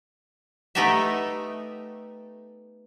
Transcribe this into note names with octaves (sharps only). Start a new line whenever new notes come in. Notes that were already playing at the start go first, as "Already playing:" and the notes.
A3 B3 D#4 G4 A4 E5